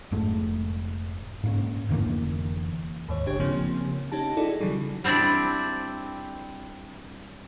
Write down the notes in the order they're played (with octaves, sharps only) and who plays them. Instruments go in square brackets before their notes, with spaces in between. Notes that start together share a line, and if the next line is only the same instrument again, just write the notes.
[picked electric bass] F1 G#2 G#3 A3
G#2 A#3 C#4
F1 D3 E3 A#3
[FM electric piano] D#2 G#2 C#5
G1 C#3 D4 G4 C#5 G#6
C#3 F3 A#3 C4
C#4 D#4 G4 A5
D#4 E4 F#4 G#4 A4 D5
C#3 E3 F#3 G3
[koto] G3 C4 D4 E4 D5